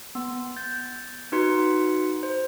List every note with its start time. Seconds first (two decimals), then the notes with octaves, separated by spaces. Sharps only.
0.15 B3
0.57 G6 A6
1.32 D#4 F#4 B4 C6 C#7
2.23 C5